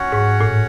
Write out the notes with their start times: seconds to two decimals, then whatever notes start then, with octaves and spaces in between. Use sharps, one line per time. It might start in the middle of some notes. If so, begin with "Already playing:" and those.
Already playing: C#4 F#4 C#5 F#5
0.12 G#2
0.41 A2